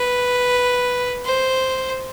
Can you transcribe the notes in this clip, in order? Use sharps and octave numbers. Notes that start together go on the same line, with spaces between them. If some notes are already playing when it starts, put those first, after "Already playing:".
Already playing: B4
C5